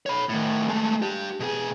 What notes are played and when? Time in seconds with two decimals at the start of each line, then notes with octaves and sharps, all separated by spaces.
0.06 C#5 B5
0.29 A2 D#3
0.68 G#3 A3
1.02 D4 G4
1.40 B2 G#4